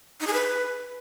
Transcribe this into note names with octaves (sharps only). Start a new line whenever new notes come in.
D#4
G#4
B4